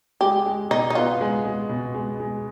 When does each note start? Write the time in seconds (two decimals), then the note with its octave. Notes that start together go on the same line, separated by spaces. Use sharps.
0.21 G#3 G4
0.46 G#3
0.70 B2 D#4
0.90 D#4
0.95 B3 F4
1.21 G#3
1.45 G#3
1.69 B2
1.94 G#3
2.20 G#3